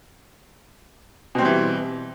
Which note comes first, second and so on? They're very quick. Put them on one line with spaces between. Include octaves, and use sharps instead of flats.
B2 C4 G3 E3